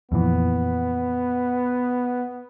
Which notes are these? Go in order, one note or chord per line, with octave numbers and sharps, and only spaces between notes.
F2 A#2 E3 B3